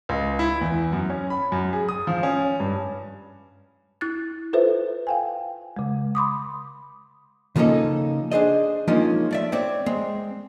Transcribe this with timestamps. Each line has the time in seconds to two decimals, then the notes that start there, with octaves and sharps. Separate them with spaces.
0.09 C#2
0.39 E4
0.61 E2
0.93 F#2
1.10 C#4
1.30 B5
1.52 F#2
1.73 G#4
1.89 D#6
2.07 F3
2.23 C#4
2.60 G2
4.01 E4 F#6 A6
4.53 F4 A4 B4 C5 E5
5.07 F5 G5 G#5
5.77 C#3 G#3
6.15 B5 C6 D6 D#6
7.56 C#3 F3 A#3 C#4 D#4 A4
8.31 D4 G#4 C5 D#5
8.88 F3 G#3 A#3 C#4 D#4 F4
9.31 A3 D5 E5
9.52 C4 C#5 D5
9.86 G#3 C4